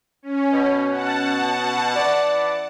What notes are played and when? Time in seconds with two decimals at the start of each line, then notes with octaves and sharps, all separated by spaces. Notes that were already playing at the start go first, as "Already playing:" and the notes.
0.22 C#4
0.53 B2
0.90 F#5 A5
1.96 E3 D5